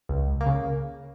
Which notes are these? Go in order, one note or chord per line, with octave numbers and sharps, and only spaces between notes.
C#2
A#3
C#3